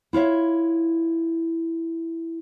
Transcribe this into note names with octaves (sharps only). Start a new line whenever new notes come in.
E4 F4 C#5 E5